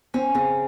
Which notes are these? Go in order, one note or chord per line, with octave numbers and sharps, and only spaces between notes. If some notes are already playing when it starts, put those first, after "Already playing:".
C4 C#4
C#3 C4